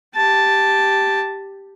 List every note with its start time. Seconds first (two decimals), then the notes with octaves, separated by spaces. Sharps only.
0.15 G4 A5